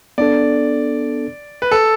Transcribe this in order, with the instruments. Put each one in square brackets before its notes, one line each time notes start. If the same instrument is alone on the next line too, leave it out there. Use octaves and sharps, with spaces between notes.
[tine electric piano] B3 D4 A4 [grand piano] D5
[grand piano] B4
A4